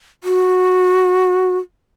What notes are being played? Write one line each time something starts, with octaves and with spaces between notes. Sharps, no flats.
F#4